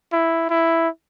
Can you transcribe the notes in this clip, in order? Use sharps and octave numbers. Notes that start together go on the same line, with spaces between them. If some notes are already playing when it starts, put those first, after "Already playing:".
E4
E4